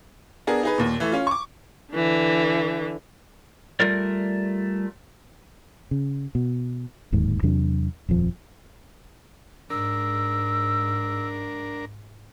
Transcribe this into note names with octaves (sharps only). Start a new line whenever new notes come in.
B3 D4 G#4 A#4
D#4 G#4 B4
D#2 A#2
E3 A3
C#4 F4
C#6 D6
D3 E3
G3 A3 F4 A#4 D5
C#3
B2
D1 D#2 G#2
E2 C3 F#3 D4
D#1 F2 F3
G#2 D4 A#4 E6